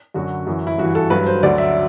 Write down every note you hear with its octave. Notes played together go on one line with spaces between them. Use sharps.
F#2 D3 F#3 F#4
F#2 E3
E4
G2 E3 F#4
A4
G2 F#3 B4
C5
D2 D3 F#3 D5
E5